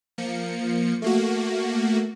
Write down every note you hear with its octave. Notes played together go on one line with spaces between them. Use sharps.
F3 A#3 C#7
A3 A#3 F#4